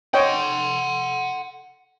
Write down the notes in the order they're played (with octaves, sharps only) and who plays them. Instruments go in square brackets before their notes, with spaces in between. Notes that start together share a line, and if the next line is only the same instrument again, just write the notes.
[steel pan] C#5 D#5 G5 [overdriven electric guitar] F#5 C6